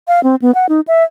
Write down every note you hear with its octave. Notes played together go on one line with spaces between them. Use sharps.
F5
C4
B3
F#5
D#4
E5